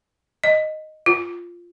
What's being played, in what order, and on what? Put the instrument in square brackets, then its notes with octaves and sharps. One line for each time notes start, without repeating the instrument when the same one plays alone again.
[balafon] D#5
F4